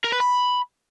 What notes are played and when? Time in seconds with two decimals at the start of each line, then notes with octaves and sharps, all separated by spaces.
0.05 A#4
0.12 B4
0.20 B5